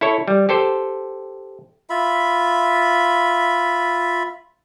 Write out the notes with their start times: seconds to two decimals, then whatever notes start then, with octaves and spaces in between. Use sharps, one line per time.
0.01 E4 A4 C#5
0.28 G3
0.49 G4 A4 C5
1.90 F4 E5 B5